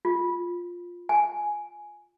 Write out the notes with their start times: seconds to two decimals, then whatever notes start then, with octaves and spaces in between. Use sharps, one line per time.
0.05 F4
1.09 G#5